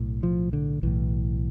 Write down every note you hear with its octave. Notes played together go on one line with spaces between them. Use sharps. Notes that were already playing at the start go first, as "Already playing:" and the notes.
Already playing: B1 A2
F3
D3
B1 A2 E3